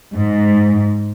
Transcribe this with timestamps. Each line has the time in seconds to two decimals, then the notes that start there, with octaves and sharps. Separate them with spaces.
0.16 G#2